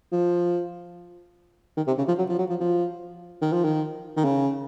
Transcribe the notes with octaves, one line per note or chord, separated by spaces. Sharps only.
F3
D#3
C3
C#3
F3
F#3
F3
F#3
F3
F3
D#3
F3
D#3
D#3
C#3